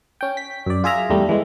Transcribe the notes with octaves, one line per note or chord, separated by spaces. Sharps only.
C#4 G5
B6
F#2 D5
F4 G#4 E5 A#5
E2 G#2 G3 A3
E3 G#3